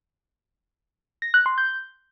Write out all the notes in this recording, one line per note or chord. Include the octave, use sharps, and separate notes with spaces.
A#6
F#6
C6
G6